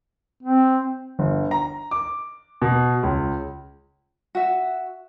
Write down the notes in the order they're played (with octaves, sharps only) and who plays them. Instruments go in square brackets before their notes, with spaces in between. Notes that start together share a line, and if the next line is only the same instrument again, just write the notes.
[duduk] C4
[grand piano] G1
A#5
D6
B2
C#2
[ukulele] F#4 E5